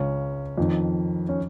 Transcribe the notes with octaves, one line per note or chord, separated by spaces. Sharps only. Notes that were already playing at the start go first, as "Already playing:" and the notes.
Already playing: C#2 C#3 C#4
F2 D#3
C#4